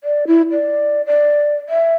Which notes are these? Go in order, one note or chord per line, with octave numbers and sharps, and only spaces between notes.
D5
E4
D5
D5
E5